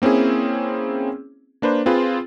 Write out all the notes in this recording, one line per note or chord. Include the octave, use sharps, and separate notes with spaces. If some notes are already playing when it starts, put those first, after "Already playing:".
A#3 C4 C#4 E4 G#4
A#3 D4 B4 C5
C4 F4 G#4 B4